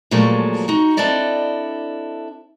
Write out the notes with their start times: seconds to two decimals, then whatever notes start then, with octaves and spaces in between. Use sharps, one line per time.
0.11 A#2 F3 F#3 G#3 A3
0.68 D#4 F#4
0.97 C4 D4 E4 A4 D5 D#5